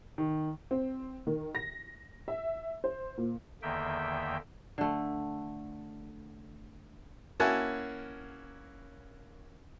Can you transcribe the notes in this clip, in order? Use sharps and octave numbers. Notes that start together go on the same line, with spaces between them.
D#3
C4
D#3
A#6
E5
C5
A#2
E2 D3 D#3 A#3 E5 G5
D3 A3
A#3 C#4 E4 F#4 G#5 A5